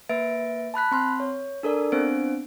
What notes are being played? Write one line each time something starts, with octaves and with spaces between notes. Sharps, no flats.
A#3 B4 E5 A6 D7
A5 B5 F#6 B6
C4 C6 F6
C#5
D4 A4 A#4 D5
B3 C4 D4 C5 D7